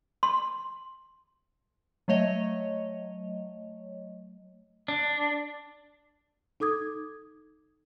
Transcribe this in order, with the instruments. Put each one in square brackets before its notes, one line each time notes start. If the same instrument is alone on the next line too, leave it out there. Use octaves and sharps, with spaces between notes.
[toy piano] C6
[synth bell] F#3 A3 C#5 D#5
[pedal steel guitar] D4
[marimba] D#4 A4 D6 D#6 G#6